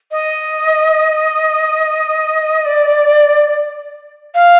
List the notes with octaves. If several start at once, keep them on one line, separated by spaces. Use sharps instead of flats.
D#5
D5
F5